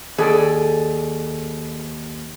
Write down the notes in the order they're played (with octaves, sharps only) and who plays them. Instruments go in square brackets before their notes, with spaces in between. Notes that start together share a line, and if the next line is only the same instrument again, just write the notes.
[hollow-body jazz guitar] D#2 [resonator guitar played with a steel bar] G#4 A4 D5